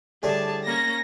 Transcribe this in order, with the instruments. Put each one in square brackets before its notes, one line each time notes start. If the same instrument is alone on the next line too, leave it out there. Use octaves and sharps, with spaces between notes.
[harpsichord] A2 D3 G3 [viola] G#4 A5
[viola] A#3 C#4 [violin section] A#6